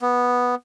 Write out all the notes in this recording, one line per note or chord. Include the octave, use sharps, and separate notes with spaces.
B3